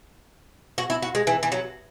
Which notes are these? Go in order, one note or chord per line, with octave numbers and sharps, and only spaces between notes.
F#4
E4
F#4
G#3
E3
E3
F#3